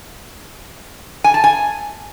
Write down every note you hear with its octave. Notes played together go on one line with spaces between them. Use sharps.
G#5
A5
G#5